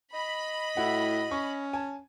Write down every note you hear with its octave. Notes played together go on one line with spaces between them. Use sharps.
D#5 B5
A2 E4 F#4 F#5
C#4 C#6
G#5 A5